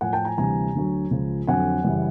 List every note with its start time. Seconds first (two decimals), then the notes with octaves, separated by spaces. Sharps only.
0.01 A2 F3 F#5 G#5
0.13 G5 A5
0.25 G#5 A#5
0.37 D2 C3 E3 G3 G#5 A#5
0.75 D2 D3 F#3
1.11 C#2 C#3 F3
1.47 F2 D3 F#3 F#5 G#5
1.84 F#2 C#3 E3 G3